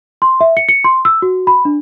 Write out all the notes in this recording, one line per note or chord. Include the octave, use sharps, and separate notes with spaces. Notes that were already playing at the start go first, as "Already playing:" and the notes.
C6
E5
C#7
C#7
C6
E6
F#4
B5
D4